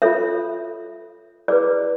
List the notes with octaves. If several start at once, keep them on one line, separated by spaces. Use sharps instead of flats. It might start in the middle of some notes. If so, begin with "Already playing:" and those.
F4 A4 C#5 E5
E4 G#4 B4 D5